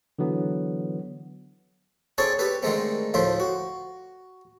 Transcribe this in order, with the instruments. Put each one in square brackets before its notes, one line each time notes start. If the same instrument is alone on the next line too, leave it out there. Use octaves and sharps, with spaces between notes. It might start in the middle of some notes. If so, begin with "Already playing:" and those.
[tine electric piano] D3 E3 F#3 B3
[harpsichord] C4 D4 G#4 A4 C#5 A5
G4 A4 B4
D3 D#3 G#3 A3 C4
D2 A2 F3 E5 C6
F#4